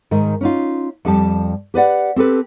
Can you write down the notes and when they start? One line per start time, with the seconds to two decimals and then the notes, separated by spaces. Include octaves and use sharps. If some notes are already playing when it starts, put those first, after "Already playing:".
0.11 G#2 D#3 A#4
0.41 C#4 D#4 F4
1.05 F2 G3 G4 A5
1.74 G4 B4 D5 F#5
2.16 C4 G4 A4 B4